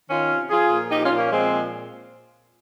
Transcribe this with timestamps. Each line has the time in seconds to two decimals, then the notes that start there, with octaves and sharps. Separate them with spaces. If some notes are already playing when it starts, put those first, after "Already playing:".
0.09 D#3 C#4 F4
0.30 C3
0.50 F3 F4 G#4
0.71 A#2
0.90 F3 D#4 G4
1.04 C#4 F4
1.12 A#2
1.18 A#3 C#4
1.31 F3 G#3 C4
1.51 A#2